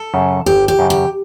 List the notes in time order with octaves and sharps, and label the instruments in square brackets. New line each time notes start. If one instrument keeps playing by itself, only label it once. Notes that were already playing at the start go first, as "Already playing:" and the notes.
Already playing: [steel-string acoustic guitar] A4
[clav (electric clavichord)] F#2 C#3
[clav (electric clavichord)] G1 [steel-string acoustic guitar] G4
[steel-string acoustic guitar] G4
[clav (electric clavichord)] F#2 C#3
[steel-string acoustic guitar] G4